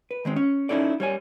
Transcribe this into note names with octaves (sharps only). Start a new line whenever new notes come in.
B4
D#3 G#3 C4
C#4
C#4 D#4 E4 A4 D5
G3 C#5 G#5